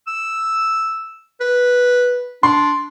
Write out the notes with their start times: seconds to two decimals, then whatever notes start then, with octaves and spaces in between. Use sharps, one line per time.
0.08 E6
1.40 B4
2.43 D4 C6